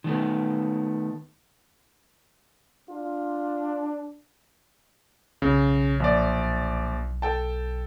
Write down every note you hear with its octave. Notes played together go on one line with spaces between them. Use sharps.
D#3 A3 B3
D4 F4
B1 C#3
A#1 D5
A4 G5 A5